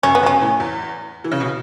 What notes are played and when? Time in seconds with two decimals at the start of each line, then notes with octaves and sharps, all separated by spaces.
0.03 F#2 C#4
0.15 B3
0.23 F#2
0.26 C#4
0.41 A2
0.60 E2
1.24 E3
1.32 C#3
1.40 B2